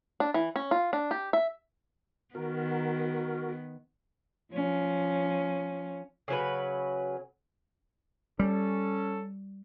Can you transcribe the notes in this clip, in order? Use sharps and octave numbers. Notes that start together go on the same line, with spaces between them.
D4
E3
C#4
F4
D4
G4
E5
D#3 B3 F#4 A#4
F3 C#4
C#3 F#3 B4
G3 C#4 A4